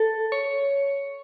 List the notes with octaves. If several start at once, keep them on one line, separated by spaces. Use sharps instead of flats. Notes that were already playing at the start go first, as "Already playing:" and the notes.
Already playing: A4
C#5